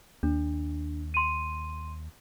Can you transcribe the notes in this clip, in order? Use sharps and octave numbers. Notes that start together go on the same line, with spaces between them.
D#2 D4
C6 D#7